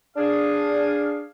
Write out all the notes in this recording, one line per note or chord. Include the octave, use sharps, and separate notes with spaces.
D4 G#4 F5